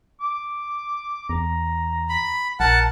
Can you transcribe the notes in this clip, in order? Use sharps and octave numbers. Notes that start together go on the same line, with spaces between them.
D6
E2 A#5
B5
A#1 A#4 F#5 A5